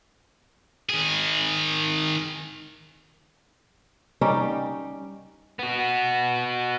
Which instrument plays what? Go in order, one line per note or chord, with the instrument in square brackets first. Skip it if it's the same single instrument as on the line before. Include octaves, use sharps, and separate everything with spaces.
[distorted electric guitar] D#3 G#4
[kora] G3 C#4 D#4 G5
[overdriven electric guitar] B3 F#4